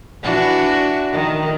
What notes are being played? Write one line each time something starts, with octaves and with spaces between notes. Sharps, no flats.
E3 D4 F#4
D#3